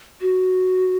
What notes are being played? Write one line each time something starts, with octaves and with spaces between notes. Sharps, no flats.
F#4